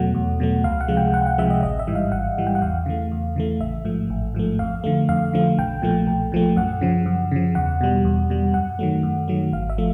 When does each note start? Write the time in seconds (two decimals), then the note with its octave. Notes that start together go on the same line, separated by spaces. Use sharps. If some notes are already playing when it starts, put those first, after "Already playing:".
Already playing: E2 B2 F#3 A3 F#5
0.14 E2
0.40 B2 F#3 A3
0.64 C#2 F5
0.81 F#5
0.88 C3 F3 G#3
0.97 G5
1.13 C#2 F#5
1.26 F#5
1.38 C3 F3 G#3 E5
1.50 D#5
1.63 A1 D#5
1.79 E5
1.87 G#2 E3 G3
1.95 F5
2.12 A1 F#5
2.38 G#2 E3 G3
2.47 G5
2.55 F#5
2.62 E2 F5
2.86 C#3 E3 A3
3.11 E2
3.36 C#3 E3 A3
3.60 A1 E5
3.85 G#2 F3 A3
4.10 A1
4.34 G#2 F3 A3
4.59 F2 F5
4.84 D3 F3 A3
5.09 F2 F5
5.33 D3 F3 A3
5.58 B1 G5
5.82 A#2 F3 A3
6.07 B1
6.32 A#2 F3 A3
6.56 F#2 F#5
6.81 C#3 F3
7.06 F#2
7.31 C#3 F3
7.55 E2 F#5
7.81 B2 G3
8.05 E2
8.30 B2 G3
8.54 F#2 F#5
8.79 D#3 F#3 A3
9.03 F#2
9.28 D#3 F#3 A3
9.52 G#1 F5
9.70 E5
9.78 F3 A3